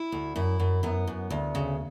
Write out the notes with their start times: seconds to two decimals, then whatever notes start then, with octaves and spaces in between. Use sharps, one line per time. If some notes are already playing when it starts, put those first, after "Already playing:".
Already playing: E4
0.12 D2
0.36 F#2 E4
0.60 F#2
0.83 F#2 B3
1.07 F#2
1.30 D2
1.55 C#3